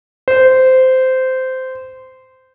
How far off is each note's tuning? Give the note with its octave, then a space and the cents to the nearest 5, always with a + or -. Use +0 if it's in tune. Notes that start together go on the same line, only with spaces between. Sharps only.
C5 -15